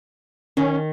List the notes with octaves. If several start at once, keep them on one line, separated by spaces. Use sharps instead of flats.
D#3 C#4